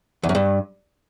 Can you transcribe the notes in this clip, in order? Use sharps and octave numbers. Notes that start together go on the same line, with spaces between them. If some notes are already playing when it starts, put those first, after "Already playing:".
E2
F#2
G2